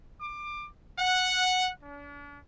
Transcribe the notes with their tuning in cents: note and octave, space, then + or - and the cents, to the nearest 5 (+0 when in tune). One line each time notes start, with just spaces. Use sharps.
D6 +20
F#5 -5
D4 -40